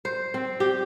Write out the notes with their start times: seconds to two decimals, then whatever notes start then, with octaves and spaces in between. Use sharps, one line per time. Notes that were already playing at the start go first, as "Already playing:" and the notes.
0.05 C5
0.34 C4
0.60 G4